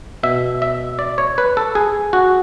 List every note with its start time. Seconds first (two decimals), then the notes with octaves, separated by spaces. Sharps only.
0.23 B2 E5
0.62 E5
0.99 D5
1.18 C#5
1.38 B4
1.57 A4
1.75 G#4
2.13 F#4